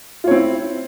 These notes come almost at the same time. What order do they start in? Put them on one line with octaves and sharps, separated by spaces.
F4 C#5 C4 E4